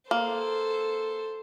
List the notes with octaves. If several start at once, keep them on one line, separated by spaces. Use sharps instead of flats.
A#3 A4 C5